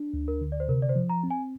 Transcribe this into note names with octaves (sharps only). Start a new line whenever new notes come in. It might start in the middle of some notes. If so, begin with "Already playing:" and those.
Already playing: D4
D2
A#4
D3
D5
C5
C3 A#4
D5
C5
F3
A#5
C4
G#5